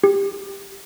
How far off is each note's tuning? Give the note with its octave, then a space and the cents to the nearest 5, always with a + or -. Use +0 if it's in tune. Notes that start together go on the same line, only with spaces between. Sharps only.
G4 +15